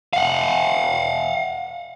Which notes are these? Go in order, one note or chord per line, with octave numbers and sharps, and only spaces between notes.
F5 F#5